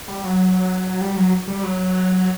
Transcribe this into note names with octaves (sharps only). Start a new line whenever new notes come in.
G3
F#3
G3
F#3
G3
F#3